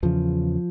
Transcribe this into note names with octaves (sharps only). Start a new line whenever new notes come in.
E2 C#3 F3